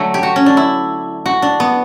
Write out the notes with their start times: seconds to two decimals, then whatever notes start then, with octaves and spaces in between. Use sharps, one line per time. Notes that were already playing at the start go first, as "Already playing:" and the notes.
Already playing: D3 F#3 A3
0.14 G4
0.23 F#4
0.36 C#4
0.46 D4
0.57 E4
1.26 F#4
1.42 D4
1.60 B3